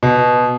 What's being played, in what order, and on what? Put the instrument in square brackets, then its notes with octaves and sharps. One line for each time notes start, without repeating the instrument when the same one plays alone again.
[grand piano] B2